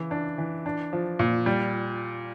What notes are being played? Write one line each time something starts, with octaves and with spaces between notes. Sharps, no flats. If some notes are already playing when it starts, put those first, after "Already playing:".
Already playing: C#3 E3
D4
E3
D4
F3
A#2
G3